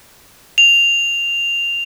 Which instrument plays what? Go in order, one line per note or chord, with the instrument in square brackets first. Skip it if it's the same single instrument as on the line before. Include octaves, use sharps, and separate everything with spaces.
[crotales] F7